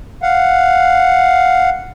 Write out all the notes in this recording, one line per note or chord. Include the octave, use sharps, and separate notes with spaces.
F5 F#5